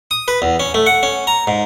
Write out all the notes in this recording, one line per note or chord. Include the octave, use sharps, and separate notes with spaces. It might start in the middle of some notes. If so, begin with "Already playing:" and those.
D#6
B4
E2
C#4
A3
F#5
C#4
A#5
G#2